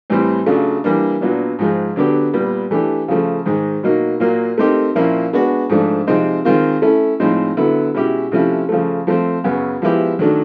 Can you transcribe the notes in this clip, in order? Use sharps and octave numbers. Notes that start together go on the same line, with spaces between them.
A2 E3 G3 C4
C#3 F#3 A3 D4 F4
E3 G3 A#3 D4
A#2 F#3 B3 D4
G#2 F3 G#3
D3 F#3 B3 D4 G4
A#2 G3 B3
E3 A3 D4 G4
C#3 F3 A3
G#2 D#3 G#3
B2 F#3 A#3 D#4
A#2 F#3 A#3
A3 C4 D#4 G4 A#4
A#2 F3 A#3 C#4 E4
G#3 B3 D4 F#4
G#2 F3 A3 D4
C3 F3 G#3 C4 D#4
D#3 G#3 C4 F4 A#4
A3 C#4 E4 A4
A2 F3 G#3 C4 D#4
D3 F#3 B3 E4 A4
B2 G#3 C#4 E4 G4
C3 F3 A3 C#4 E4
C#3 F3 A3
F3 A3 C4
F#2 C#3 F#3 B3
F3 G#3 B3 E4 G4
D#3 F#3 A3 D4